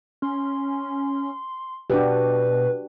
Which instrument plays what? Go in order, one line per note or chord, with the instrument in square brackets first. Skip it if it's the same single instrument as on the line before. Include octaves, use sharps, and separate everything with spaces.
[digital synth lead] C#4 [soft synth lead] C6
[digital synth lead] B2 [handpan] D4 F#4 G4 [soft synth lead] B4